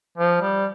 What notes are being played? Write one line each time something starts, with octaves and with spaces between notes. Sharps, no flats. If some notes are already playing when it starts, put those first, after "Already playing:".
F3
G3